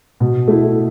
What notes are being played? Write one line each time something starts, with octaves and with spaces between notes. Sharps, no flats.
B2
A3 E4